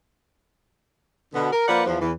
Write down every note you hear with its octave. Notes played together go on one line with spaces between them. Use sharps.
B2 D3 B3
A#4
F3 A#3 A#4 B4 D5 F#5
E2 F3
E2 E3